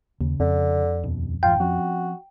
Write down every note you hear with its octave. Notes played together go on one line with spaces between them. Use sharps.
D#2 C#3
F2 D3
D#2 B2
G1 G#2 E3 F4 G5
F3 C4 C#4 F#4